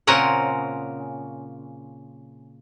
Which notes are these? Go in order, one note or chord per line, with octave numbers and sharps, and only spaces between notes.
A#2 C#3 C4 C#4 A#4 F#5